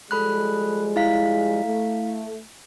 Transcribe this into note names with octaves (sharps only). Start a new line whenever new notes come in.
F3 G3 G#3 A4 B5 F#6
E4 F5 B6
A3